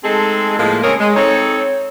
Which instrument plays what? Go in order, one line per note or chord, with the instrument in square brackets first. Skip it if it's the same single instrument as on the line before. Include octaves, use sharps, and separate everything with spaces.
[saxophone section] G#3 A3 C4 D#4 G#4 A4
A2 F3 G#3 A#3
C#3 G#3 C4 G#4 A#4 C#5
G#3
C4 D#4 A4 C#5